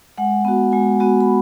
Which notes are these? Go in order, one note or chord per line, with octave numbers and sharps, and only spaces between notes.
G#3 F#5
B3 F#4
G#3 G#5
B3 F#4
B5